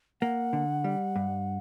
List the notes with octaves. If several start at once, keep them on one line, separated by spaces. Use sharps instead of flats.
A#3 F#5
D3
G3
G2